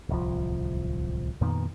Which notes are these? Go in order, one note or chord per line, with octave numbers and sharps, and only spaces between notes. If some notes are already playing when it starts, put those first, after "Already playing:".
D1 C2 F3
F2 A#2 D#3 B3